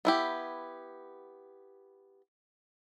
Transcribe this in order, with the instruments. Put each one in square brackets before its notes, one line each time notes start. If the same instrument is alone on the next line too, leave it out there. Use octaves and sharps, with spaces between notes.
[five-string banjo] B3 E4 G4